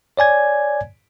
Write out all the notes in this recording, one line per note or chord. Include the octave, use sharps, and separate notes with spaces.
C#5 D5 G#5 G#6